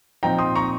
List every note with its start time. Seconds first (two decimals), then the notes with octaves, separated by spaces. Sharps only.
0.23 A#2 F3 C4 D#4 G5 A#5
0.39 C6 D#6
0.55 A#5 C#6